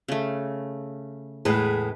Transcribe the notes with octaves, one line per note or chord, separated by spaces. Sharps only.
C#3 A3
E2 A2 G#3 B4